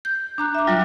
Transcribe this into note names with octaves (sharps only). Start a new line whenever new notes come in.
G6
D4 A#5 F#6
E5 D6
F#3 G3 F4